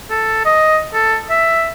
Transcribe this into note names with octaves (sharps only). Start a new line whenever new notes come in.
A4
D#5
A4
E5